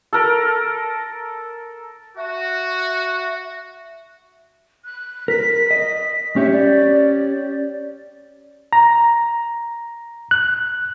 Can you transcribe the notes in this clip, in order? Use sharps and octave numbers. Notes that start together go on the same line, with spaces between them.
A4 A#4
F#4 E5
F#6
A#4 B6
D#5
C#4 G4 C#5 E5
D5
A#5
F#6